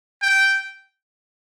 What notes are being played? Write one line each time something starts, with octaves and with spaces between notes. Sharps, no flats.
G5